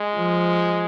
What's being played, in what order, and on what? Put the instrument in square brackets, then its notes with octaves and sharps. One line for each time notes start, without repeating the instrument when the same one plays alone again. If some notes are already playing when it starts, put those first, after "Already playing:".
Already playing: [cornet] G#3
[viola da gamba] F3